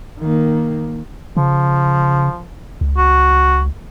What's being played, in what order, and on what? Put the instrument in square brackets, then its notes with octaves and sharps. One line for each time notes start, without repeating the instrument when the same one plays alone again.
[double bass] D#3 A#3
[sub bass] C#3 [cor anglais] F3
[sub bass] C#2
[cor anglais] F#4